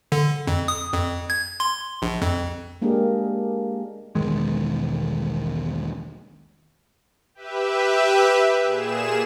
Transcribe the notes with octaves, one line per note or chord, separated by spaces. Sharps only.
D3
F2
D#6
F2
G#6
C6
A#1
F2
G#3 A#3 D4 G4 G#4 A#4
E1 B1 D#3 G#3
G4 B4 E5
A#2 G#4 E7